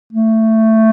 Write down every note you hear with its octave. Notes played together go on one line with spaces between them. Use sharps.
A3